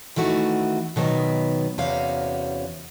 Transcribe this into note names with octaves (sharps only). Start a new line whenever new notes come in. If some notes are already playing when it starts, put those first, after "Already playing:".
D#3 E3 A3 F#4
B2 D#3 F#3 B3 B4
E2 C3 C#4 F#4 F5